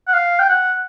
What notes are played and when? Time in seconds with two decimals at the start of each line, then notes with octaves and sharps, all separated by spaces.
0.08 F#5
0.13 F5
0.39 G5
0.49 F#5